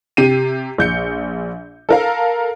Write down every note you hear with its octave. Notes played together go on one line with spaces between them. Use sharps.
C3 G4 C7 D#7
A#1 G6 C#7
A4 A#4 F5